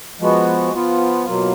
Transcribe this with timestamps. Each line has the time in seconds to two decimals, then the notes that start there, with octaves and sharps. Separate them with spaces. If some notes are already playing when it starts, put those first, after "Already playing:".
0.20 F3 G#3 B3 F#4
0.73 F3 B3 F4
1.25 B2 F#3 A#3 F4